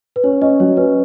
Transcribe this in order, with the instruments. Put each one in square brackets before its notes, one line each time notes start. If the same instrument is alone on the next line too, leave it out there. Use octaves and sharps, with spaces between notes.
[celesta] B4
[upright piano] C#4 [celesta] C#5
[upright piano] C#4 [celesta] D#5
[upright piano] F#3 [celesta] C#5
[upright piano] C#4 [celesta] B4